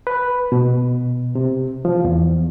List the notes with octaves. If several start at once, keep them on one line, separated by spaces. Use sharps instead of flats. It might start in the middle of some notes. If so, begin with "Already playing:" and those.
B4
B2
C3
F3
E2